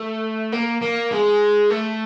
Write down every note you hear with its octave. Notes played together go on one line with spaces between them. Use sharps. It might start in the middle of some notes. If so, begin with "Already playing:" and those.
Already playing: A3
A#3
A#3
G#3
A3